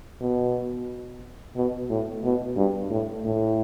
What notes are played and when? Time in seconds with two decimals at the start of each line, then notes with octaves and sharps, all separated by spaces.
0.21 B2
1.56 B2
1.90 A2
2.24 B2
2.57 G2
2.90 A2
3.25 A2